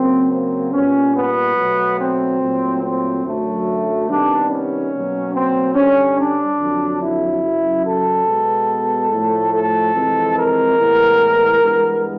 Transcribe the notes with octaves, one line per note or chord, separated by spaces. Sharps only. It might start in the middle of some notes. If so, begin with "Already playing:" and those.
Already playing: C#3 F#3 A#3 C4
C4
A#2 G3 B3 C#4
B3
B2 F#3 A3
C4
A#2 F#3 A3
C4
F#2 D3 F#3 A3
C3 D#3 G3 B3 D4
C#4
B2 F#3 A#3
C4
G2 D3 G3 C#4
D4
F2 D3 F#3
E4
F#2 C#3 F#3
A4
B2 G#3 B3
A2 F3 A3
A4
F2 C3 E3 G#3
A#4
A2 E3 G#3 B3
G2 E3 G#3 B3